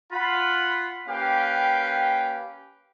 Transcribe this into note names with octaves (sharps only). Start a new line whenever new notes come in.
F4 F#5 B5
A#3 C#4 G4 B4 F5 G5